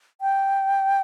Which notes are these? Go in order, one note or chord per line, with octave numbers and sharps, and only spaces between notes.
G5